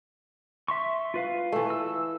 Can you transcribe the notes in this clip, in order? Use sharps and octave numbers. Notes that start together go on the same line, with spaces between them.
E5 C6 C#6
F4 B4 F5
E3 A3
E6